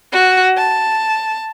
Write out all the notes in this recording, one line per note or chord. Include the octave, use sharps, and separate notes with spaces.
F#4
A5